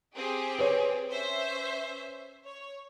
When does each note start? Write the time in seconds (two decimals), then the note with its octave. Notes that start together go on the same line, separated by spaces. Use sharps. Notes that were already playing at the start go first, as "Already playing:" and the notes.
0.15 C4 G4 G#4
0.59 B4 C#5
1.10 C#4 C5 E5
2.45 C#5